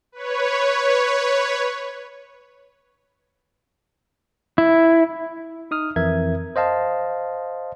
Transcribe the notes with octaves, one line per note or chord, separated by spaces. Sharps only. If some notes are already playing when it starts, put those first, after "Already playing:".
B4 C#5
E4
D#4 D#6 F6
F2 E3 A#4 E5 G#6
C5 D#5 F5 A5